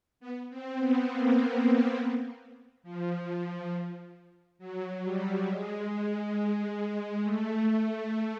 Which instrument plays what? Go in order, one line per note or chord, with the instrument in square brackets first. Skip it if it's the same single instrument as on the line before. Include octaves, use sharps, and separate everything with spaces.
[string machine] B3
C4
B3
A#3
F3
F#3
G3
G#3
A3